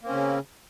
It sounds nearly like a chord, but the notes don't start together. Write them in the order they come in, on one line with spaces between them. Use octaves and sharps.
A#3 C4 C#4 C#3